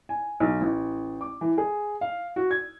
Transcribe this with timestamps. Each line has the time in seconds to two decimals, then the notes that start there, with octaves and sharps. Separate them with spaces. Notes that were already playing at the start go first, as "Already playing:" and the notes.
0.09 G#5
0.40 B1
0.61 A1
1.21 D6
1.41 E3
1.58 G#4
2.01 F5
2.36 F#4
2.51 G#6